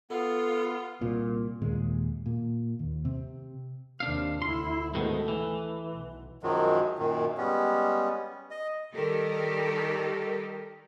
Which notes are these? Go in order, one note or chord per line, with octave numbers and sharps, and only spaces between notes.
B3 F4 A4
C2 A#2
D#2 A#2 G#3
A#2
D#2
C3 C4
D#2 C3 D4 F5
D2 E4 C6
G#2 B2 D#3 A3
E3
B1
F#2 D#3 F3 F#3 G#3
F#2 A#2 D#3
G3 G#3 B3 C#4
D#5
D#3 G3 G4 A4 A#4 D#5